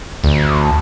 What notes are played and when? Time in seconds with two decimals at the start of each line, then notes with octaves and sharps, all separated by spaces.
0.24 D2